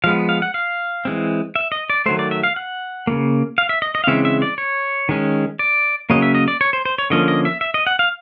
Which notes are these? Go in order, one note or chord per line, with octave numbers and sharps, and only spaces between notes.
F3 G#3 B3 F5
F5
F#5
F5
E3 G#3 C4
E5
D#5
D5
D#3 F#3 A3 C5
D5
E5
F5
F#5
C#3 F3 A#3
F5
E5
D#5
D#5
F5
C#3 E3 G#3 C4 E5
E5
D5
C#5
D#3 G#3 C#4
D5
C#3 F#3 A#3 C#4 D#5
E5
D#5
D5
C#5
C5
C5
C#5
D3 F3 A#3 C#4 D#5
D#5
E5
E5
D#5
F#5
F5